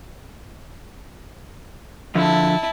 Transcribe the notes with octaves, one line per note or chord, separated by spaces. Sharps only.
D3 F3 E4 A5